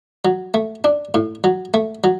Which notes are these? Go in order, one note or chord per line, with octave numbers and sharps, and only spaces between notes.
F#3
A3
D4
A2
F#3
A3
F#3